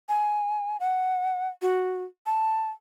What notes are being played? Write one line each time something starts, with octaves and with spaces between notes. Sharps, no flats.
G#5
F#5
F#4
A5